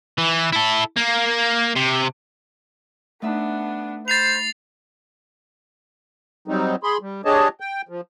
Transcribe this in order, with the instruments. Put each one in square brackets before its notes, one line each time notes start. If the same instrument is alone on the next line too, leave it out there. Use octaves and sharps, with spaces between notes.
[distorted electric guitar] E3
E4 A4
A#3
C3
[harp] A3 D#4 E5 [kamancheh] B3 D4
[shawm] C5 [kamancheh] B5 [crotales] A6 C7 F7
[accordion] F#3 G3 C4 D#4
G#4 B5 C6
G3
D4 G4 G#4 C#5 D#5 A5
G5
F3